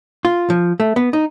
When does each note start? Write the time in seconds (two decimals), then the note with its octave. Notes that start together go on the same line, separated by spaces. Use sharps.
0.25 F4
0.50 F3
0.80 A3
0.96 B3
1.13 D#4